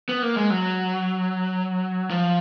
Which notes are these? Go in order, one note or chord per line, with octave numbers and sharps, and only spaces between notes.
B3
A#3
G#3
F#3
F3